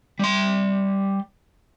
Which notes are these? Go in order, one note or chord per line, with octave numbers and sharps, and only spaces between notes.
G3 C6